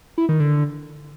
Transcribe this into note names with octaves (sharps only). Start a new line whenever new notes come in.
E4
D#3
D3